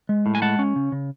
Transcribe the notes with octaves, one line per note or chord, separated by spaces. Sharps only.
G#3
A2
G#5
G#3 F#5 A5
C#4
C#3
C#3